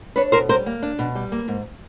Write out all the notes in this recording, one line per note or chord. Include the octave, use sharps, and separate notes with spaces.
D4 B4 C#5
B2 A#4 C5
G3 A#4 C5
A#3
D4
B2
G3
A#3
G#2